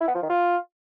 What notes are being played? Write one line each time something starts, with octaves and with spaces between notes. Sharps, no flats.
E4
B3
F3
D#3
F4